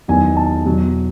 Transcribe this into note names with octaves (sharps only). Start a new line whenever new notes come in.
E2 D#3 F#3 G#5
A5
E2 B2 F#3